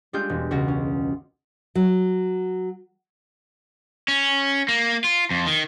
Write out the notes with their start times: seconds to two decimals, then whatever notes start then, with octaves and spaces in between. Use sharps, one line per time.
0.13 G3 G#3 D4 F4 G6
0.29 E1
0.51 C#2 F#4 A#6
0.68 C#4
1.75 F#3
4.08 C#4
4.68 A#3
5.04 F4
5.31 F2
5.47 D#3